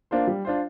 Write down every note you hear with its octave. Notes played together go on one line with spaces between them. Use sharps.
A#3 D4 F4 C5
G3
D4 F4 C5